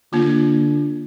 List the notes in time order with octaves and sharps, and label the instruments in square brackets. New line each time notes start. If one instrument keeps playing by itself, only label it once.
[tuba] D3 [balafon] A#3 F4